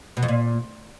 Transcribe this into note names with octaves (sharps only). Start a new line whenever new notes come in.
B2
F2
A#2